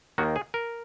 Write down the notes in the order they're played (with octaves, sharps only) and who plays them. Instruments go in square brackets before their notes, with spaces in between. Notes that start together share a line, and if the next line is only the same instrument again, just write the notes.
[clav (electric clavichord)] D#2 D#3 A#3 F#4
G#4
A#4